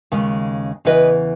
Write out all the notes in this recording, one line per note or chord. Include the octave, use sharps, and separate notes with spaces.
D#2 C#3 G#3
E2 C#3 E3 B4 D#5